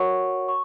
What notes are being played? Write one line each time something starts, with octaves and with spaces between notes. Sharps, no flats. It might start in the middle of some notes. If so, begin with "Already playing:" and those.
Already playing: F#4 A#4 C#5 F#5 C#6
C#6